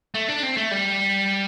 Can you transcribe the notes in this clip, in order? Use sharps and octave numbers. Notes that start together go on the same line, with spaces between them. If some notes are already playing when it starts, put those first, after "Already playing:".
A3
D4
C4
A3
G3